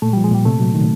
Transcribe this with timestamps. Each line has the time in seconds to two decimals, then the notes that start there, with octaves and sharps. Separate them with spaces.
0.02 A#2 A3
0.13 F3 G3
0.24 G#3
0.31 A#2 G3
0.45 C3 A3
0.60 F#3
0.74 D#3